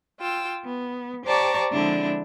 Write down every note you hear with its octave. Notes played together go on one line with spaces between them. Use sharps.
F4 G5 E6
B3
G4 C5 D5 A5 A#5 C#6
D3 F3 G#3 C4 D4 E4